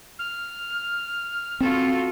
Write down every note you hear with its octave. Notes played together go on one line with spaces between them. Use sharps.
F6
C4 F4 F#4 A4